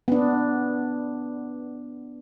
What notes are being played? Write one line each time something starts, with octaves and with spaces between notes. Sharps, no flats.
B3 D4